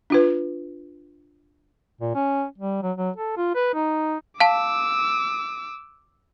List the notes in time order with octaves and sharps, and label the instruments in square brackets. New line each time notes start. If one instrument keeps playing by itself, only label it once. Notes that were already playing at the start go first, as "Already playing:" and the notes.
[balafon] D4 F4 B4
[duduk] A#2
C#4
G3
F#3
F#3
A4
F4
B4
D#4
[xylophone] F5 A5 [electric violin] D6 E6